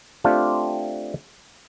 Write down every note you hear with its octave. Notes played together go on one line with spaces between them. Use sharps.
A3 C4 D4 F4 G4